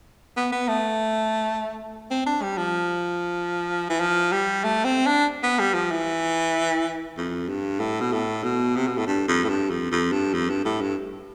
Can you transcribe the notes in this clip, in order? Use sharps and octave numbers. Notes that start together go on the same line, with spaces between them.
B3
B3
A3
C4
D4
G3
F3
E3
F3
G3
A3
C4
D4
B3
G3
F3
E3
F2
G2
A2
B2
A2
B2
C3
B2
A2
G2
F2
A2
G2
F2
F2
G2
F2
G2
A2
G2